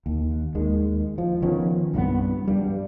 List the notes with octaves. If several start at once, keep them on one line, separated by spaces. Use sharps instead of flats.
D#2
D#2 D#3 G#3
F3
D#3 F3 B3 C#4
C2 G2 E3 B3
G2 G3